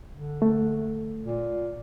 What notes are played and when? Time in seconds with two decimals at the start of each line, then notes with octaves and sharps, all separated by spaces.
0.12 D3
0.42 A3
1.20 A#2